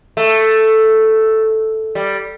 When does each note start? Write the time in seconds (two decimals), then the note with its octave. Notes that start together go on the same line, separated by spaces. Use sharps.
0.17 A3
1.95 G3